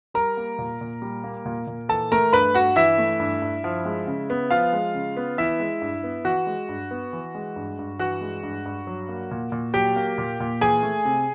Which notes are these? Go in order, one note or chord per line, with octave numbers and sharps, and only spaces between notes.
G3 A#4 A#5
A#3
A#2
A#2
G3
A#3
A#2
A#2
E3 A4 A5
A3 A#4 A#5
G2 B4 B5
G2 F#4 F#5
E3 E4 E5
A3
G2
G2
F3
G#3
C#3
B3
F3 F4 F5
G#3
C#3
B3
E3 E4 E5
G#3
G2
B3
E3 F#4 F#5
G#3
G2
B3
E3
G#3
G2
G2
E3 F#4 F#5
G#3
G2
G2
F#3
A#3
A#2
A#2
F#3 G4 G5
A#3
A#2
A#2
E3 G#4 G#5
A3
C3